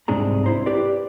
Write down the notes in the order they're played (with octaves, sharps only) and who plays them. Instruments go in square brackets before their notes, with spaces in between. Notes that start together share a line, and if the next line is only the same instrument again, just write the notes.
[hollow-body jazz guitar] C2 G#2 C4 D4 G#4 A#5
E4 C5 A#5
G4 B4 D5